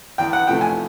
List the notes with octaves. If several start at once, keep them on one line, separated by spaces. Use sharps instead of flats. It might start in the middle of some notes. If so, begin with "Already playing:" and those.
E2 G5
F#5
C3 F3 A3 G5
G#5